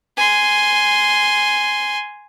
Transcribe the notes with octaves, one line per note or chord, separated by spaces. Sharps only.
G#5 C6